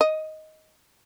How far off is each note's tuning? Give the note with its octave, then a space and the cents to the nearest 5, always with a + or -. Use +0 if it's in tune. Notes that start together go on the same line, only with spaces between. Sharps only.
D#5 +10